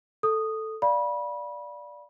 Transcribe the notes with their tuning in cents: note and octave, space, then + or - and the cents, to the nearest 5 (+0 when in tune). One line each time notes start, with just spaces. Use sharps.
A4 +0 D#6 -10
D5 +0 F5 +0 B5 -25